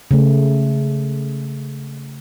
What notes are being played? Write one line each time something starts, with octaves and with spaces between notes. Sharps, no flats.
C#3 A3